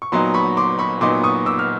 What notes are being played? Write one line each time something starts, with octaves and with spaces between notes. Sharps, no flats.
C#6
A#2 F#3 B3 D#4 A#5 C6
B5 C#6
C6 D6
B5 C#6
A#2 F#3 B3 D#4 C6 D6
C#6 D#6
D6 E6
F6